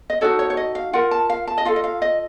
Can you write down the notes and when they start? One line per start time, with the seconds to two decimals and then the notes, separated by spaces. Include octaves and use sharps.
0.10 D#5
0.21 D#4 F#4 A4 C#5
0.39 C#5
0.50 C#5
0.57 D#5
0.75 F5
0.93 F4 A#4 F#5
1.11 A5
1.30 F5
1.47 A5
1.58 D#5
1.65 F4 A4 F5
1.76 D#5
1.84 F5
2.02 D#5